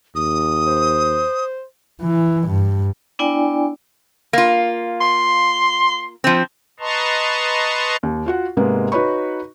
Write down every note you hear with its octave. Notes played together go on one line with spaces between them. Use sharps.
D#2 D#6
C5
E3
G2
B3 D4 E4 D5 G5 G#5
A#3 F4
C6
F3 C4
B4 D#5 A5 A#5 C6 C#6
D#2
F4 F#4 F#5
G#2 C3 G#3 A#3 B3
D#4 F#4 B4 C#5 B5 C#6